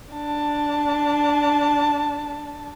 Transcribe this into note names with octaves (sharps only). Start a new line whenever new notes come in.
D4 A5